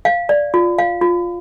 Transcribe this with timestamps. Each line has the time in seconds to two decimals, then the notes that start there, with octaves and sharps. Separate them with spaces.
0.05 F5
0.29 D5
0.54 F4
0.78 F5
1.01 F4